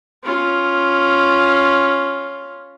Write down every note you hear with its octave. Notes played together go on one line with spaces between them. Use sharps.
C#4 F4